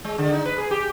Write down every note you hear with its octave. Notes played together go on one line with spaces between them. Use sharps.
G#3
D3
D#4
B4
G#4
G4